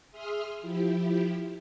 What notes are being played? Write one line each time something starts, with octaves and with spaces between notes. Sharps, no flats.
G#4 E5 C6 D#6 F6
F3 E4 G4